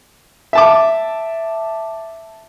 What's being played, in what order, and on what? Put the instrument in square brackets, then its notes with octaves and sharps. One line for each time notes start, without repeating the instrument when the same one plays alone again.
[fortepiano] E5 A5 D6